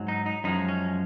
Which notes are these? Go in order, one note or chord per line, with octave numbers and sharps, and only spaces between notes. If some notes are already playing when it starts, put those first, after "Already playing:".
Already playing: G#2 F#3
D#4
D#4
F#2 F3 G#3 D#4
C#4